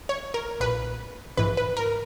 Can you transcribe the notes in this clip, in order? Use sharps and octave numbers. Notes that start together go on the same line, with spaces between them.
C#5
A#4
B1 A#2 B4
A#1 G#2 E3 B4
B4
A#4